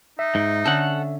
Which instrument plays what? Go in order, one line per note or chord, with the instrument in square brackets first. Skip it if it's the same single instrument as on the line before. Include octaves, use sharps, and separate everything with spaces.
[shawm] D#4 [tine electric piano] E5
[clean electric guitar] G#2
[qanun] D3 C#4 [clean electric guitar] A4 F#5